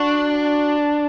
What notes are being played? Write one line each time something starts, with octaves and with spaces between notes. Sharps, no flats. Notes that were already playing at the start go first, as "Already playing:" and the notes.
Already playing: D4 F#4